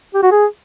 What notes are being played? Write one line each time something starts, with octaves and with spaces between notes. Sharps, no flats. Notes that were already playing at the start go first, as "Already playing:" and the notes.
G4
F#4
G#4